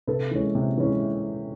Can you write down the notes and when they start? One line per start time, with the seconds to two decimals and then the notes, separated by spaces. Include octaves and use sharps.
0.07 C3 A4 B4
0.31 E3 G#3 C#4
0.55 C3
0.77 E3 G#3 C#4